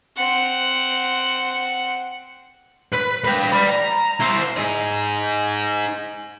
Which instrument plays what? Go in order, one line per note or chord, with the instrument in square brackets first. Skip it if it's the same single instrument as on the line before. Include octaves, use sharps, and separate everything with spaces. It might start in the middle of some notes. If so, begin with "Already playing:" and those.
[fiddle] C4 F#5
[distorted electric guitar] B4
B4 G5
D5 B5
A#5
E4 C5
[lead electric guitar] D#4 G#4